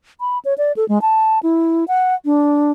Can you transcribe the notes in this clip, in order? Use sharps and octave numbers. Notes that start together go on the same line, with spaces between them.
B5
C#5
D5
A4
G#3
A5
E4
F#5
D4